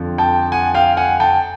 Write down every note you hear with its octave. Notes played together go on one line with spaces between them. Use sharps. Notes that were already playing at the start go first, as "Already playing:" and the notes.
Already playing: F2 D3 F3
G5 A5
F#5 G#5
F5 G5
F#5 G#5
G5 A5